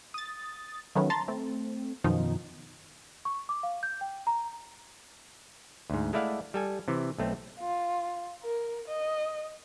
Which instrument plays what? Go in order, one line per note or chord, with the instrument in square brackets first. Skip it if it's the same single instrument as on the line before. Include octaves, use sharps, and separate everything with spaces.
[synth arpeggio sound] D#6 A6
D#3 F#3 A3 B3 C#4
A5 A#5 C6 A6
A3 C4
F#2 B2 D#3 F3 D#4
[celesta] C#6
D6
F5
G6
G5
A#5
[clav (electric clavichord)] D2 G#2
G#3 A3 E4 D5 F5 F#5
G3 A4 G#5
C3 E3
B1 A3 C4
[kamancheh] F4
A#4
D#5